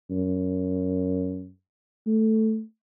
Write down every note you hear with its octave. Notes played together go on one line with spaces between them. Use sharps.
F#2
A3